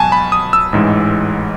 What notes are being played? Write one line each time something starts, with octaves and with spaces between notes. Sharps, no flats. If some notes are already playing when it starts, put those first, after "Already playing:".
Already playing: C#2 B2 F#3 G#5 A5
B5
D#6
E6
A1 G#2 E3 G#3